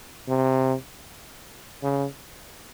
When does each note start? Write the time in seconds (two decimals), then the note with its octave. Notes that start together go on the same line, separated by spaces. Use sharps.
0.28 C3
1.82 C#3